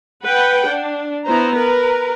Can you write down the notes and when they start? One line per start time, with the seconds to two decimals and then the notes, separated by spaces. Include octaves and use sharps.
0.23 B4 F#5 G5
0.68 D4
1.25 B3 E4 C5 A#5
1.55 A#4 B4